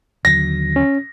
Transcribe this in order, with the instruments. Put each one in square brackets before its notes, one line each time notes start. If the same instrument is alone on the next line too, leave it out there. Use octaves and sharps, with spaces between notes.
[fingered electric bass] D#2 D3 F#3 [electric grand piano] A#6
[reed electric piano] C#4